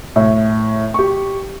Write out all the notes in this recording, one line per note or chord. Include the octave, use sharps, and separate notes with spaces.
A2
G4 C#6